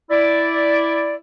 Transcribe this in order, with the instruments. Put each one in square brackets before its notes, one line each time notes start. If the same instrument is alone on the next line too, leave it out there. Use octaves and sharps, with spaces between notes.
[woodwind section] E4 D5